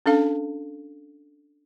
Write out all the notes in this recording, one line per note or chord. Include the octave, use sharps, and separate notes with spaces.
C#4 D4 A4 F5